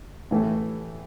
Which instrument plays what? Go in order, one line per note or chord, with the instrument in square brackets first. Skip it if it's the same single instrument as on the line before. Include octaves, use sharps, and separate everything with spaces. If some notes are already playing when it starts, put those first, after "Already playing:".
[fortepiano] A2 E3 A3